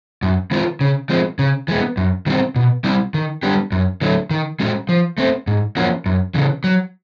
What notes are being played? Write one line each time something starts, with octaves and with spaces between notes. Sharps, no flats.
F#2
D#3 G#3 C4 F4
C#3
F3 G#3 C4
C#3
E3 G#3 B3
F#2
D#3 G3 C4
B2
G3 C4 E4
D#3
G3 B3 D4 G4
F#2
D3 F#3 A3
D#3
G#3 C#4 F#4
F3
A3 C4
G#2
F3 A#3 C#4 F#4
F#2
C#3 E3
F#3